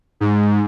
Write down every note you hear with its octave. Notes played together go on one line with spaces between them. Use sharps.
G#2